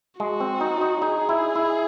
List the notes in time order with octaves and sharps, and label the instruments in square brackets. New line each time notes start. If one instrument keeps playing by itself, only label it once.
[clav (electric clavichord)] G#3 [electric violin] F#4
[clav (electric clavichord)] C4
D#4
D#4
[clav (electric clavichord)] D#4 [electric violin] G#4
[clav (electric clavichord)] E4
E4